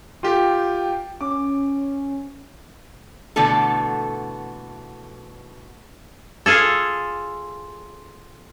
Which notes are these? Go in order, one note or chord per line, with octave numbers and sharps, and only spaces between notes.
F4 G4 G5
C#4 D6
B2 D3 E3 A3 A4
F4 G#4 A4